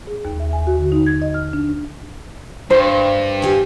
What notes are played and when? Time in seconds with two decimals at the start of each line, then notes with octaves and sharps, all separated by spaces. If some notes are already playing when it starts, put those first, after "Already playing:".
0.07 G#4
0.25 D#2
0.40 E5
0.53 G#5
0.67 F#4
0.78 D3
0.92 D#4
1.06 G#6
1.22 D#5
1.34 F6
1.53 D4
2.70 G2 C5
3.42 G4 G#5